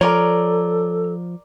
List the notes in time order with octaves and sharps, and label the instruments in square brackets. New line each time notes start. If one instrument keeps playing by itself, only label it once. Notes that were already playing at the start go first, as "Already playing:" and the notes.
[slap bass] F3 [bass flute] A4 [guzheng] A#4 D5 [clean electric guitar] C#5 A#5